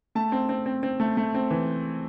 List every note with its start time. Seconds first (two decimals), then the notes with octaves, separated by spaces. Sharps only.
0.15 A3 A5
0.32 C4
0.49 C4
0.66 C4
0.83 C4
1.00 A3
1.17 A3
1.35 C4
1.50 E3